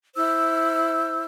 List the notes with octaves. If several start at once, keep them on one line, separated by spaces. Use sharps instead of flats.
E4 C5 E6